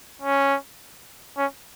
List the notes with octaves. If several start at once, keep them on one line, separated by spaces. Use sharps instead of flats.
C#4
C#4